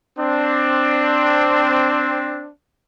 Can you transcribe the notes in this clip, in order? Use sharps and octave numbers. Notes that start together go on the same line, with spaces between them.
C4 D4